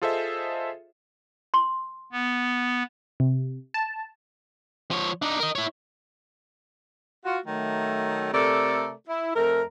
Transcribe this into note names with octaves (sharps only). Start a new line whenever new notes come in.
F4 G#4 A4 C5 D#5 E5
C6
B3
C3
A5
F3 C#5
D4 D#4
A#4 D#5
E4 C#5
F4 F#4
D#3 F#3 A3
C3 A3 A4 A#4 D5
E4
F2 A3 A#4